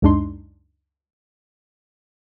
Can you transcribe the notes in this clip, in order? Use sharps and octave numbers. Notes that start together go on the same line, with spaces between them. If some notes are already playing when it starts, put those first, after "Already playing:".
C#2 F#2 G#3 D4 D#4 C6